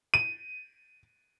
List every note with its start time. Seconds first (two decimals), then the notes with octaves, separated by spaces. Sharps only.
0.14 D#7